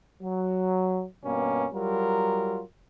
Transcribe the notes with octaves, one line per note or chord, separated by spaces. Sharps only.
F#3
G2 B2 A#3 C#4
F#3 G3 F4 A#4